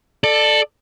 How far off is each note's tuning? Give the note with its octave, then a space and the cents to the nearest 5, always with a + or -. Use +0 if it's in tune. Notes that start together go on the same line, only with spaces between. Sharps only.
A4 +0 D5 +20